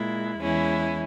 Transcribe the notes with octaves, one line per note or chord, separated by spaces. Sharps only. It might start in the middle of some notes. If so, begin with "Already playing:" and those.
Already playing: A#2 G#3 E4
E2 E3 G#3 C#4 E4